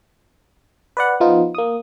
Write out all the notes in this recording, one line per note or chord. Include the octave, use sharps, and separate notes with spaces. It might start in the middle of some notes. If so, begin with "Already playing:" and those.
B4 D5 F#5
F3 B3 D#4 F4
A#3 D#6